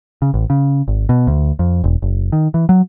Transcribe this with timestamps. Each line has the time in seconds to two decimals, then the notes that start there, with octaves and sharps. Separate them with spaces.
0.22 C#3
0.34 A1
0.50 C#3
0.88 G#1
1.09 B2
1.27 D2
1.59 F2
1.84 E1
2.02 F#1
2.32 D#3
2.54 E3
2.69 F#3